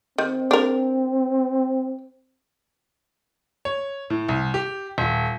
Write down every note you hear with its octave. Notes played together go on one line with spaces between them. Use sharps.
D#3 C4
D4 A#4
C#5
A2
C2
G4
D#1